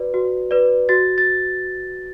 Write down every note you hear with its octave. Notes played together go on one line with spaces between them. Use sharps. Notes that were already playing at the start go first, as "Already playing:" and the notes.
Already playing: F#4 B4 D5
F#4
B4 D5
F#4 A6
A6